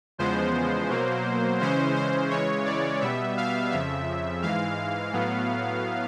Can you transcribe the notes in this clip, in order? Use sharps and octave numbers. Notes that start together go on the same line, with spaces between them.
E2 C#3 F3 G#3 B3 C5
B2 F#3 A#3
C#3 E3 G#3 C#4 C5
C5
C#3 E3 G#3 C#5
D5
B2 G3 B3 E5
F5
F2 C#3 F3 E5
G#2 E3 G#3 F5
A2 F#3 B3